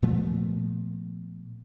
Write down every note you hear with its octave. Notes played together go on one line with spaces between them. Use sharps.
A#2 F3 A3 B3